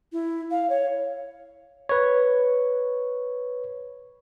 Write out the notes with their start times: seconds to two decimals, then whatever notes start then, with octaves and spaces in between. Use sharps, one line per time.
0.12 E4
0.51 F5
0.69 C#5
1.89 B4 C#5